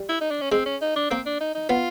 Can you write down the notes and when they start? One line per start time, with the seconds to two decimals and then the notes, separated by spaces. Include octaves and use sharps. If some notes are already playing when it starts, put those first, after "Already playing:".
Already playing: G3
0.09 E4
0.21 D#4
0.31 D4
0.41 C#4
0.51 G#3 C4
0.66 C#4
0.82 D#4
0.96 D4
1.10 A#3 C4
1.26 D4
1.40 D#4
1.55 D#4
1.69 B3 F4